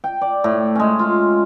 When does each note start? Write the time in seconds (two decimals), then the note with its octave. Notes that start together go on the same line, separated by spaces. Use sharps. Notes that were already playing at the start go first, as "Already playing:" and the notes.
0.04 G5
0.21 D5
0.44 A2
0.75 G#3 C#4
0.99 F4